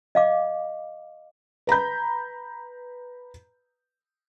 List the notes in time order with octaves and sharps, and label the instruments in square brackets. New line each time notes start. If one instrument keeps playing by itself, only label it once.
[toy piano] D#5 F5 D6
[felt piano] B4 A#5 B5 G6